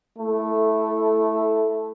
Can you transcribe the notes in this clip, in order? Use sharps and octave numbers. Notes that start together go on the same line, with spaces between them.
A3 E4 A4